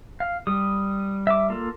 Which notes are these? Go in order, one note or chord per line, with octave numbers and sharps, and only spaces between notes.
F5
G3 D#6
E5 D6
A#3 F4 A4